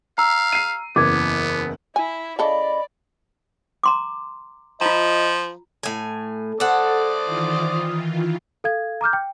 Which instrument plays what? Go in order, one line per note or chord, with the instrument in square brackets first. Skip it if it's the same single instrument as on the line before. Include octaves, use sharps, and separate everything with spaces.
[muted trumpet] F5 [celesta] A#5 E6
[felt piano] C7 D#7
[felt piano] F#1 E2 [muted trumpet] B3 [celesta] D6 G#6
[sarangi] E4 [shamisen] G#5
[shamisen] C#3 E4 A4 [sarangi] D5 [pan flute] D#5 [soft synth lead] B5
[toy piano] A#5 C6 D6
[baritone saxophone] F3 [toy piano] F4 A#5 [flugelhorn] D#5
[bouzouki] A2 G#5
[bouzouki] A4 F#5 [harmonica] C5 D5 D#6
[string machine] D#3 E3 F4
[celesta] A4 F5 G#6
A#5 D6 F6 G6
G5